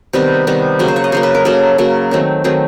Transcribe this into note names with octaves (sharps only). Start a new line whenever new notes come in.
C3 D#3 G3 B3 B4
C3 D#3 G3 B3
C#3 F#3 A#3
C5
C#5
D#5
C#3 F#3 A#3 C5
B4
A#4
C#3 F#3 A#3 A4
C#3 F#3 A#3
D#3 F#3 A3 C4
D#3 F#3 A3 C4 G#4